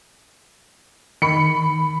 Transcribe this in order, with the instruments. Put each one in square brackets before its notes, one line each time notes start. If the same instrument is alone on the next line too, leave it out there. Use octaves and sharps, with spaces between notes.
[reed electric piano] D#3 [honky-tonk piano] B5 C#7